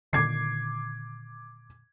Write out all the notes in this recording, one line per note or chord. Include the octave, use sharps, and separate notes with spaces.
A#2 D3 D#3 D6 G#6 C7